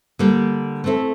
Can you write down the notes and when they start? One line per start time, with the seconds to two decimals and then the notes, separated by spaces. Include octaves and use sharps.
0.19 D3 G3 A#3
0.84 A3 C4 E4 A4